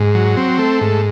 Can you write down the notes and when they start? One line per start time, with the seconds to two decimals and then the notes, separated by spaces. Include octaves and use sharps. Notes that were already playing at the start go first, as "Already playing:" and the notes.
Already playing: G#2
0.15 F#3
0.37 C4
0.59 A3
0.81 G#2